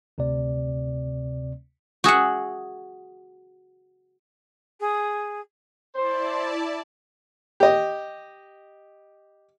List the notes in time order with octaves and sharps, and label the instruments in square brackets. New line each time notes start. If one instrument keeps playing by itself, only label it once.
[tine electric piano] D2 C3 C4 D5
[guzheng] F#4 G#4 E5 F#5
[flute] G#4
[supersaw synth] E4 D5 A5 [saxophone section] C5
[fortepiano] G4 D#5